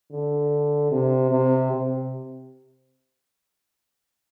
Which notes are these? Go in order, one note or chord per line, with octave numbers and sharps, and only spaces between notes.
D3
C3
C3
C3